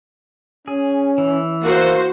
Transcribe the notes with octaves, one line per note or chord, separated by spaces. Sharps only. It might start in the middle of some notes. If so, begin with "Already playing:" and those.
C#4 G#4
E3
A#3 F#4 C5